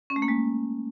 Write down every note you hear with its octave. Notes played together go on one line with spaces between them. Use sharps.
C#4
A3
A#3
G#3